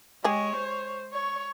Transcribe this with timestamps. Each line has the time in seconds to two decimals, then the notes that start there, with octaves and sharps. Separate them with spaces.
0.24 G#3 G4 G#4 C#5
0.56 C5
1.13 C#5 C#6